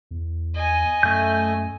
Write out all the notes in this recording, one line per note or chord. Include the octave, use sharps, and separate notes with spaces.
E2
D#5 G#5
F#2 A3 G6